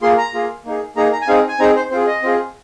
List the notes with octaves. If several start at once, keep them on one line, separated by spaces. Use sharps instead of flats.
A#3 F4 G#4 C6
A#5
A#3 F4 G#4
A#3 D#4 G#4
A#3 D#4 G#4 A#5
A#5
G#5
C4 D#4 G#4 F5
G#5
C4 D#4 G#4 A#5
C5
C4 F4 G#4 C5
D#5
C4 F4 G#4